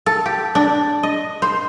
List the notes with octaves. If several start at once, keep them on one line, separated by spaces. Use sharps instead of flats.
A4
G4
D4
D#5
C5